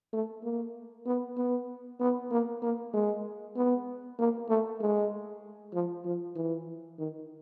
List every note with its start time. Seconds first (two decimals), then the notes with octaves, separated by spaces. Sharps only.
0.13 A3
0.44 A#3
1.06 B3
1.38 B3
2.00 B3
2.31 A#3
2.62 A#3
2.94 G#3
3.56 B3
4.19 A#3
4.49 A3
4.81 G#3
5.74 F3
6.05 F3
6.36 E3
6.99 D#3